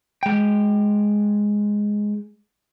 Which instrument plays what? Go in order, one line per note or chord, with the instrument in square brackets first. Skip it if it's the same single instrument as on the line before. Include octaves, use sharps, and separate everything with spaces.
[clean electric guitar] G#3 G5